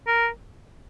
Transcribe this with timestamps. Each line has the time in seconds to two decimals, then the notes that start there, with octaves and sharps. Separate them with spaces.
0.07 A#4